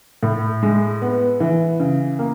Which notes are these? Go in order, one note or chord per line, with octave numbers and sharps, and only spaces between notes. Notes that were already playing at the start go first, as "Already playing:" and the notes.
A2
G#3
B3
E3
C#3
A#3